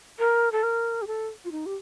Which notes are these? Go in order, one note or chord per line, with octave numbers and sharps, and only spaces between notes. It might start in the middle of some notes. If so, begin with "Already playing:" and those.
A#4
A4
A#4
G4
A4
F4
D#4
G4